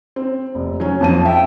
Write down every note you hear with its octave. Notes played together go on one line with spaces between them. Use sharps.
C4
F1
F#3 C#4
F2 F3 A5 D#7
E5 G5